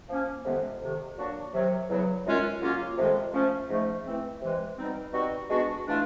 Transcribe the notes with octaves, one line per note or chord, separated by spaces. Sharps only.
F3 A#3 C#4
F2 C3 D#3 G#3 B3
F2 C3 D#3
A#2 F#3 A#3 D4 F#4
C3 D#3 F#3
E2 C#3 F#3
F#2 D#3 G#3 C#4 F4
C#3 F#3 A#3 C#4 F4
F2 C3 D#3 G#3
F3 A3 C#4
G#2 F3 A3
E3 A3 C4
C3 E3 G#3
B2 G3 C4 D#4
B2 G3 C4 D#4 F#4
B2 G#3 B3 D4 F#4
E3 A3 D4 F4